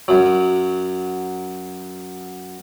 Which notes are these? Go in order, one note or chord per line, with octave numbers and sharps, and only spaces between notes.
F#2 F#3